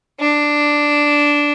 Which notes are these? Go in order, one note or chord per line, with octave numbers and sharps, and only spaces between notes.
D4